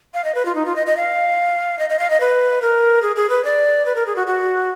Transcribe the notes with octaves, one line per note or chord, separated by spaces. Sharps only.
F5
D#5
B4
F4
D#4
F4
D#5
D#5
F5
D#5
D#5
F5
D#5
B4
A#4
G#4
G#4
B4
D5
B4
A#4
G#4
F#4
F#4